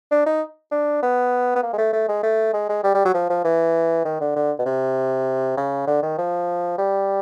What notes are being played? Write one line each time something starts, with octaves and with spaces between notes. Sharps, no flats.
D4
D#4
D4
B3
B3
A#3
G#3
A3
A3
G#3
A3
G#3
G#3
G3
G3
F#3
F3
F3
E3
D#3
D3
D3
B2
C3
C#3
D3
D#3
F3
G3